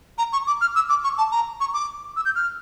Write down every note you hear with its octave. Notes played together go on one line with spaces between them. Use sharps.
A#5
C#6
D6
F6
E6
D6
C#6
A5
A#5
C#6
D6
E6
G6
F6